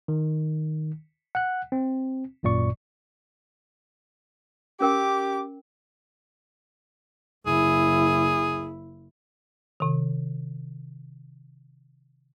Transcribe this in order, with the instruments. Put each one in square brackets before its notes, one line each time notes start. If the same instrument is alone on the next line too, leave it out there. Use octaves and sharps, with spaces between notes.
[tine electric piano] D#3
F#5 F#6
C4
G#1 F#2 A#2 D5 C#6
[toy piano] C#4 A#4 G5 [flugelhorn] G4 [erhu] D6
[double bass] F#1 E4 [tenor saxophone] G#4
[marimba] C3 D#3